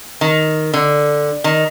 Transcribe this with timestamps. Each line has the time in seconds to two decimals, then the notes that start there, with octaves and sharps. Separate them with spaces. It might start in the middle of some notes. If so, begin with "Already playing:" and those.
0.21 D#3
0.73 D3
1.44 D#3